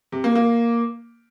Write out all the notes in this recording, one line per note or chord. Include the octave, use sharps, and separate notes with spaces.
C3
A#3
A#3